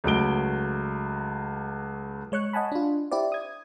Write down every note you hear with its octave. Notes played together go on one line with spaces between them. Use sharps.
C#2 F#3 A3 D7 G7
G#3 C#5 C#6 F#6
D#5 F#5 G#5 A5 B5
D4 F4
E4 G4 C5 D5
D#6 G#6